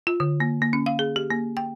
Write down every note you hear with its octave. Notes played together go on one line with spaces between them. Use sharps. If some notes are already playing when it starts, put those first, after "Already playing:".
F4
D3
A#3
A#3
C#4
F5
G#4
G4
A#3
G5